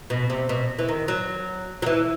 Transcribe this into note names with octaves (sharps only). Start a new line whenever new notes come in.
B2
C3
B2
E3
D#3
F#3
F#3
E3